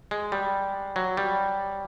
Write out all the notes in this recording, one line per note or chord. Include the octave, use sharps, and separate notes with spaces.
G#3
G3
F#3
G3